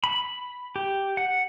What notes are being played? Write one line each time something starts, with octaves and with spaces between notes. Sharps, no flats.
B5
G4
F#5